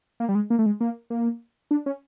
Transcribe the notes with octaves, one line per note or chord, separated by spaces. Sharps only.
A#3
G3
G#3
A#3
A3
G#3
A#3
A#3
D4
C#4